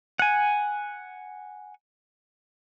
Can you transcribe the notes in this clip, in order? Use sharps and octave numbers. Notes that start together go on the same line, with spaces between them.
F#5 G#5